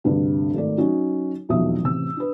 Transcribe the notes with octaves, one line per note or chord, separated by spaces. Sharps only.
D2 G2 C3
G#1 A3 D5
F#3 C#4 D#4 F#4
E1 B1 F2 E5 D#6
A1 C3 E6
D4 B4